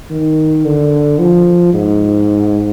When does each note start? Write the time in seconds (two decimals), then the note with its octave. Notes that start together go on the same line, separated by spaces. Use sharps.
0.10 D#3
0.64 D3
1.19 F3
1.73 G#2